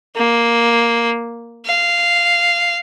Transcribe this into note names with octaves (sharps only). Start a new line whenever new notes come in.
A#3
F5